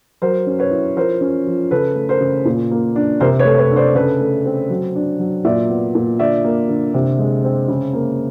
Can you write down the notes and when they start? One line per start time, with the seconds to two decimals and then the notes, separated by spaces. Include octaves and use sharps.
0.22 F#3 A#4 C5
0.47 C#4
0.59 B4 C#5
0.71 E4
0.96 F3 A#4 C5
1.21 C#4
1.46 F3
1.71 C#3 A4 B4
1.96 A3
2.09 A#4 C5
2.21 C#3
2.45 A#2
2.71 A#3
2.96 D4
3.20 C3 A#4 C5
3.39 B4 C#5
3.45 A3
3.58 B4 C#5
3.71 D4
3.76 C5 D5
3.95 C#3 A4 B4
4.21 A3
4.45 C4
4.70 F#3
4.96 D4
5.19 F#3
5.45 A#2 D5 E5
5.69 B3
5.95 A#2
6.19 D3 D5 E5
6.44 A#3
6.69 D3
6.94 C3
7.19 G#3
7.44 C4
7.68 C#3
7.93 A#3